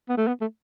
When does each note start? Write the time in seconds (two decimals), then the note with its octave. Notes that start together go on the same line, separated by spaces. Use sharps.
0.09 B3
0.18 A3
0.27 B3
0.41 A3